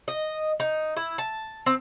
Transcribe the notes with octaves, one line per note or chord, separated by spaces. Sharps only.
D#5
D#4
E4
A5
C4